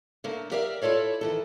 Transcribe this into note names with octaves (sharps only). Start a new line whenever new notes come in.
D3 A3 A#3
G4 A#4 D5 E5 F5
E4 F4 A4 C#5 D5
D#3 E3 A4